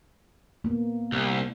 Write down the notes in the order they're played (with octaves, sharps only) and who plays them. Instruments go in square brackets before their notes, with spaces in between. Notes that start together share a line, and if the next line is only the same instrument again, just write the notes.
[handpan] A#3 B3
[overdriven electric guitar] C2